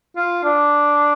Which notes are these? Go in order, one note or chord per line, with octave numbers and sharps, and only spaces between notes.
F4
D4